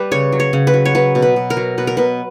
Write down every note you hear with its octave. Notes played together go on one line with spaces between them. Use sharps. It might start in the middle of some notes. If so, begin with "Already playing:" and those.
Already playing: G3 G4 B4
C#3 C#5
F#3
C#5
C#3
B4
F#3
C#5
F#3 B4
B2
B4
B2
A#4
F#3
B2 B4
A#4
B2 B4